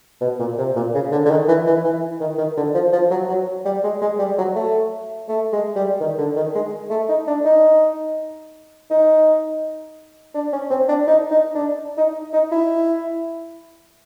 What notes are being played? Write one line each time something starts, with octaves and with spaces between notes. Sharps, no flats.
B2
A#2
C3
A#2
C#3
D3
D3
D#3
E3
E3
E3
D#3
D#3
D3
F3
F3
F#3
F#3
G3
G#3
G#3
G3
F#3
A3
A3
G#3
G3
D#3
D3
D#3
G#3
A3
D#4
D4
D#4
D#4
D4
C#4
C4
D4
D#4
D#4
D4
D#4
D#4
E4